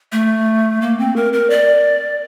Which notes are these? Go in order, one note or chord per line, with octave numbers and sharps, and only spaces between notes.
A3
A#3
C4
A#4
A#4
D5